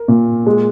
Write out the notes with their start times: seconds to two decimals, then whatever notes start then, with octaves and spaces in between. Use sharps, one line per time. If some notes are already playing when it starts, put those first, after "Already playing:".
Already playing: A#4
0.08 A#2
0.47 G#3